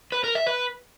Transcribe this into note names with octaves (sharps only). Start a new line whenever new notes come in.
B4
A#4
E5
B4